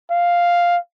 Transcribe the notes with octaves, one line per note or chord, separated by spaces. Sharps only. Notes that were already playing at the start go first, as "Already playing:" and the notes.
F5